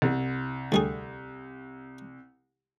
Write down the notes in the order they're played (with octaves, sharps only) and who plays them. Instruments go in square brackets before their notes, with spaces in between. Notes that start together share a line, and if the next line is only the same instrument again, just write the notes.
[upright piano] C2
[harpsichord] D2 G3 G#4